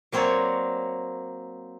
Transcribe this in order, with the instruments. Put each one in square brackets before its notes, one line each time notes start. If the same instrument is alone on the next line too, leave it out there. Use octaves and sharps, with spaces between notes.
[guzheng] F#3 A#3 C4 A#4 C#5 D5